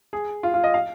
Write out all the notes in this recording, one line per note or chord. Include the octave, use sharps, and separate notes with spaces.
G#4
F4
F4
D#5
F5